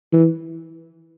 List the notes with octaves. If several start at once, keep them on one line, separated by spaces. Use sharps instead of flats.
E3